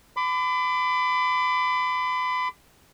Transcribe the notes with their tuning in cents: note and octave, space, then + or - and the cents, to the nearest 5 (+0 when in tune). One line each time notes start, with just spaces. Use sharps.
B5 +35 D6 +0